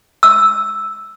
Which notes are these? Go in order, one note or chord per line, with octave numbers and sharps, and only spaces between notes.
E6